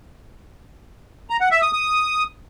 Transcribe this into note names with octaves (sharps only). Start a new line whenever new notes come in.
A#5
F#5
E5
D#6
D#6